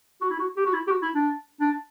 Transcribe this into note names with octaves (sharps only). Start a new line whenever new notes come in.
F#4
E4
F#4
G4
F#4
E4
G4
F#4
E4
D4
D4